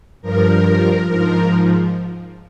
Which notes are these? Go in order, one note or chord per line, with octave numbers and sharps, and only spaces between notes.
G2 F3 A#4
G#2 F3 A#4